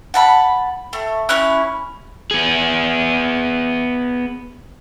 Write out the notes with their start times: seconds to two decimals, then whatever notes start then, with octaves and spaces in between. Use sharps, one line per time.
0.14 F#5 A5 B5
0.93 A3
1.29 C#4 E4 F#6
2.31 B3 G#4